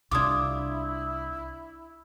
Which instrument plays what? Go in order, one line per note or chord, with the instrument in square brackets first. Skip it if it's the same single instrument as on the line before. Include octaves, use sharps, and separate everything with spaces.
[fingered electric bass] C2 C3 [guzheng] D4 F4 [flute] E4 [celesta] D6 D#6 G#6